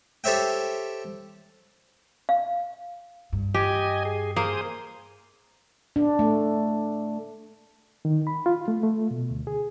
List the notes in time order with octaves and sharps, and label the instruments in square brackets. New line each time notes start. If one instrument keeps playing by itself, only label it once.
[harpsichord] G4 A4 C5 C#5 E5 G5
[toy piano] F5
[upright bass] G2
[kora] G4 [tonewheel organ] D#5 G#5
[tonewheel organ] G#4
[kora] A#3 [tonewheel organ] G#4 C5 D#6
[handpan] D4
A3
[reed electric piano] D#3
B5
F4
A3
A3
B2
D2
G#4